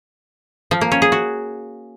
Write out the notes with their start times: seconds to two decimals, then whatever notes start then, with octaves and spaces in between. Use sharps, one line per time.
0.71 F3
0.81 A#3
0.92 C#4
1.02 G#4
1.12 F#4